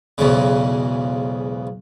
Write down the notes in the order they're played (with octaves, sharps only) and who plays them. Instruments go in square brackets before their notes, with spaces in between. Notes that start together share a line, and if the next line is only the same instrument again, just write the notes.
[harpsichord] B1 E2 G#2 C#3